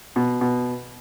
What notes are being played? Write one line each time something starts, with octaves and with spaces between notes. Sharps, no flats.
B2
B2